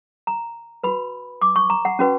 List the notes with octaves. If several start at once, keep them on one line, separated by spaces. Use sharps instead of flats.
A#5
F#4 B4 B5
D6
C#6
A#5
F#5
C#4 F#4 B4